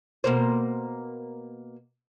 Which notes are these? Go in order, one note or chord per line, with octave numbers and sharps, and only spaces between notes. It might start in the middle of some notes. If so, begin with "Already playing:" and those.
B2 A#3 C5